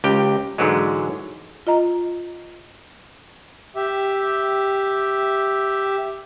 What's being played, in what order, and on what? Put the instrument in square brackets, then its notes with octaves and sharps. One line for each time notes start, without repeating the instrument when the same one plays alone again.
[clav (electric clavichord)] C#2 G4 G5
G#2 D3 E3 F#3 G#3
[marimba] F4 D#5 A#5
[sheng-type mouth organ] G4 E5